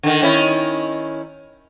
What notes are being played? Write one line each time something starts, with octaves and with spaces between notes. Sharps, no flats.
D3 D#3
D#3 C#4 E4